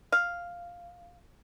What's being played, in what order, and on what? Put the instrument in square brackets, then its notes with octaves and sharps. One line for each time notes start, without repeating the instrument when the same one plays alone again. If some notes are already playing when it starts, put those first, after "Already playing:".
[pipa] F5